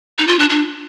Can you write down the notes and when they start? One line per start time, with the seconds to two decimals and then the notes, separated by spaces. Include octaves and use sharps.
0.18 D#4
0.27 F4
0.39 D4
0.50 D4